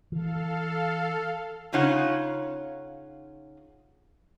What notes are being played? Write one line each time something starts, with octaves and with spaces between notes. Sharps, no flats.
E3 A4 F5
C#3 D#4 F4 C#5 F#5